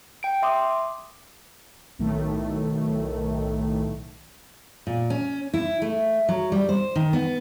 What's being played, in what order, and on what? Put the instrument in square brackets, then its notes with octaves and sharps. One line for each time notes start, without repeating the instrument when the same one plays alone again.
[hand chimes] G5 D7
E5 C6 D6 D#6
[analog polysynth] B1 A2 D#3 A3
[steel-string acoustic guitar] A#2
C#4
E4
A3
F#3
G3
C5
D#3
B3